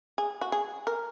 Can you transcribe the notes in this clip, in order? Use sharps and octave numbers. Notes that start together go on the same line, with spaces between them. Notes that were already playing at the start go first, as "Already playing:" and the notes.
G#4
F#4
G#4
A#4